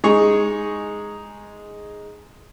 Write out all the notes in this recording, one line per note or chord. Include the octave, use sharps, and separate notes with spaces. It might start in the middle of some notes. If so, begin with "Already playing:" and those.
G#3 D#4 G#4 C#6